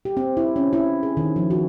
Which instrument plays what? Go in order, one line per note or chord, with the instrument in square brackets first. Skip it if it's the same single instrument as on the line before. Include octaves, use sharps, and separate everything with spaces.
[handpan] G4
C4
E4
C#4
E4
G#4
D#3
F3
F#4